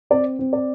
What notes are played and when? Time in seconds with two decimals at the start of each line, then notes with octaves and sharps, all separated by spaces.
0.10 C4 D5
0.39 C4
0.53 D5